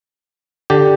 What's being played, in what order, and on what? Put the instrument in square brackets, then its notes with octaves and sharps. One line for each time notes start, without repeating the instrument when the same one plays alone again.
[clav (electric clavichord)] D3 G4